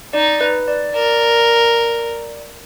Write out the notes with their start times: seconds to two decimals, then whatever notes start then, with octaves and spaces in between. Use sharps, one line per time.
0.13 D#4 D5
0.41 B4
0.68 D5
0.94 A#4 D5